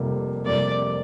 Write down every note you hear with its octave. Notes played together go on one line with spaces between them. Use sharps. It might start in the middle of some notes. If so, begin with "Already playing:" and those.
Already playing: F1 F2 C3 G3 A#3
F1 F2 C3 G3 A#3 D5